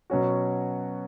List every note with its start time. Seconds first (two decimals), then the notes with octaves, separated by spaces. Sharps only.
0.10 B2 F#3 C#4 F#4